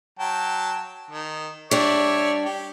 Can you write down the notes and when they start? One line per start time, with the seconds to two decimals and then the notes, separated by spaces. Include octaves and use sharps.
0.19 F#3 G5 A5
1.11 D#3
1.71 G3 D4 C#5 D5 E5
2.45 G4